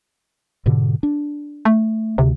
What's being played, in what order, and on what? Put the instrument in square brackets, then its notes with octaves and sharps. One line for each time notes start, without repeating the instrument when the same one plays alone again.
[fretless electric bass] G#2 B2 D3
D4
[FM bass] A3
[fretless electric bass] D2 [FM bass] C3